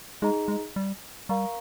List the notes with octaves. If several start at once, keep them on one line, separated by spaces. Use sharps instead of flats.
G#3 D#4 G#4 D#5 A#5
G#3
G3
G3 A#4 F5 A#5 C#6